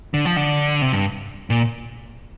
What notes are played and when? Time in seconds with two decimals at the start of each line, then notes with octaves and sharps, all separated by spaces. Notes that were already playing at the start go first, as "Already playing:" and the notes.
0.14 D3
0.25 F3
0.36 D3
0.82 C3
0.93 G2
1.50 A#2